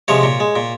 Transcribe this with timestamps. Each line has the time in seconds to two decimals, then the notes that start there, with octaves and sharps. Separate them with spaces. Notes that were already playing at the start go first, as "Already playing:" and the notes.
0.08 C3 F3 G#3 C#5
0.23 A#2
0.40 G#3
0.56 A#2